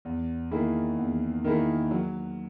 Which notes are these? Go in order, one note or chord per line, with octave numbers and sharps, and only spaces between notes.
E2
D#3 A#3 E4 G#4
E2
D#3 A#3 E4 G#4
F#3